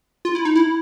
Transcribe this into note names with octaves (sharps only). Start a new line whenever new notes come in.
F4
E4
D#4
E4